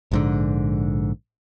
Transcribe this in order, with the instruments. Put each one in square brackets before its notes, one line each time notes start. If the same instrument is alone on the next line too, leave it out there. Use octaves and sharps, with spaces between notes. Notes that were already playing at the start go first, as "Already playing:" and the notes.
[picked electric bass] A#1 G#2 D3